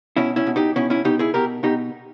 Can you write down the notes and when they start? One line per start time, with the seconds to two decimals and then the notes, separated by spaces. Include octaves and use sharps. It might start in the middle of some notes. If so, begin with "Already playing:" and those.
0.16 B2 C#4 E4
0.36 C#4 E4
0.47 B2
0.56 D#4 G4
0.76 B2 C#4 E4
0.90 C#4 E4
1.05 B2 D#4 G4
1.19 E4 G#4
1.34 B2 G4 A#4
1.63 B2 D#4 G4